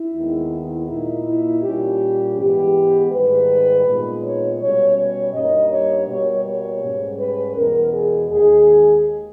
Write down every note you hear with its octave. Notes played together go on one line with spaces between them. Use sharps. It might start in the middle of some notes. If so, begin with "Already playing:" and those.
Already playing: E4
D#2 D#3 G#3 B3 D#4
E4
A#2 A#3 D#4 E4
E4
A#2 G3 C#4 G4
G#2 E3 G#3 B3 G4
G#2 D#3 G3 B4
A#2 G#3 B3 D#4
C#5
B2 G3 C#4 C#5
C#5
G2 G3 A#3 D#4 D#5
C#5
B2 G3 A#3 C#5
C#5
G#2 G3 C#4
B4
E2 B2 G#3 A#4
G#4
D#2 D#3 G#3 D#4 G#4